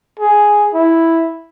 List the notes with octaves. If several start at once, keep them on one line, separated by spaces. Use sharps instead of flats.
G#4
E4